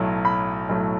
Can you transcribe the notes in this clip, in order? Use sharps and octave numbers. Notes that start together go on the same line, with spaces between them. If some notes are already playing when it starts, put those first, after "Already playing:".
Already playing: B1 A2 F#3 A3
B5
B1 A2 F#3 A3